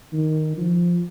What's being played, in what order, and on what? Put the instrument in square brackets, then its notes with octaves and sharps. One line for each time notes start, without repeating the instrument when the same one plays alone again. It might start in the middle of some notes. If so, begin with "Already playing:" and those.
[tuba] D#3
F3